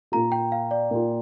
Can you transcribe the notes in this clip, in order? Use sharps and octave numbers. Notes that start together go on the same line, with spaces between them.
A#2 A#3 F4 A#5
G5
F5
D5
A#2 A#3 F4